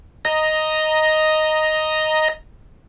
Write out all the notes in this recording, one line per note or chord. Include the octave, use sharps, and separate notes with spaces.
D#5 A#5